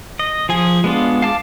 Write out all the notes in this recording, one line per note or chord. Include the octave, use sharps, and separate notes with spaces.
D#5
F3 G#4 G#5
G#3 B3 D4 F4
F5 A5 D6